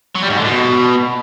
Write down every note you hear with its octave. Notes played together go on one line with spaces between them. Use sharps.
F#3
G3
G#2
D3
B2